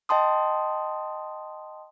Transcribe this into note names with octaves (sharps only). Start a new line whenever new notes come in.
D#5 G5 A5 C6 D#6